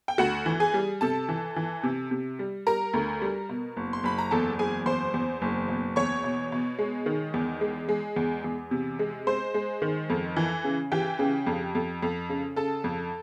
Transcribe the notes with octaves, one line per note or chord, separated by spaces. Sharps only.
G5
D2 F#4 F#5
E3
G#4 G#5
G3
C3 A4 A5
E3
E3
C3
C3
G3
G3 A#4 A#5
D2
G3
B2
F#1
C6
F#1 B5
A#5
E2 A4 A5
F#1 G#4 G#5
E2 C5 C6
E2
F#1
B2
E2 C#5 C#6
B2
B2
G#3
D#3
E2
G#3
G#3
E2
E2
C3
G#3
G#3 C5 C6
G#3
D#3
F2
E3
C#3
E3 G4 G5
C#3
F2
F2
F2
C#3
C#3 A4 A5
F2